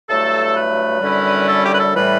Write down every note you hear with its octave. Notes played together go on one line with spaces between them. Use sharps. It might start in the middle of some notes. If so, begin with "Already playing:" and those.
G2 F#3 A3 E4 A4
B4
F#2 D3 G3 C#4 E4
A4
G4
B4
A4
A2 E3 G3 B4